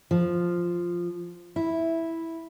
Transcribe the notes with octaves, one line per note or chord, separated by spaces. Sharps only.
F3
E4